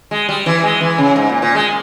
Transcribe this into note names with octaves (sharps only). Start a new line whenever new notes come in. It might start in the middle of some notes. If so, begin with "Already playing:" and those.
G#3
G3
E3
G#3
E3
C#3
G#2
A#2
A#2
G#3